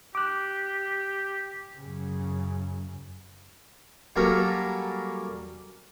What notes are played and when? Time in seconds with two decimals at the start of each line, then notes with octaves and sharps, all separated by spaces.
0.15 G4 D6 F#6
1.77 F#2 C#3
4.16 F#3 G3 A#3 C#4 A4 A#4